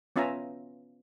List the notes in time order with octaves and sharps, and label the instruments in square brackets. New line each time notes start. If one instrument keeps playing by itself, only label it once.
[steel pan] B3 C#4 F4 E5 G#5 A#5